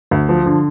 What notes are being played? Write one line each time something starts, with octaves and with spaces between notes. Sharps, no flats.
D2
F3
D3